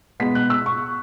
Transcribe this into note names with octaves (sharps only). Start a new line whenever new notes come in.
B2 G#3 B3 B6
F#6
E6
C#6